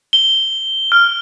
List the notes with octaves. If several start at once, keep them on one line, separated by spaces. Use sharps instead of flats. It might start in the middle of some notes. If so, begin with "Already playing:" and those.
G7
F6